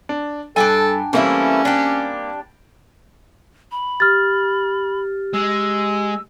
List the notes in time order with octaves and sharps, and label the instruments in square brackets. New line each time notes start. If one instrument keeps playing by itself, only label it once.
[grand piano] D4
[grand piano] G2 [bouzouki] D4 G5 G#5 [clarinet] A4
[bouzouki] E3 A3 E4 [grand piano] G3 A#3 C4 [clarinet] C#4
[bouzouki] D4 G4
[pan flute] B5
[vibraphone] G4 [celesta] F6 A6
[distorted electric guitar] G#3 [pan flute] E6